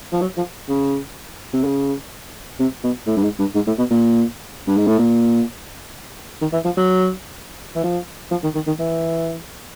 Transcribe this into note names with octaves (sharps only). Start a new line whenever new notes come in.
F3
F#3
F3
C#3
C3
C#3
C3
B2
A2
G2
G#2
G2
G#2
A2
B2
A#2
G2
G#2
A2
A#2
D#3
E3
F3
F#3
E3
F3
F3
D#3
D#3
D#3
E3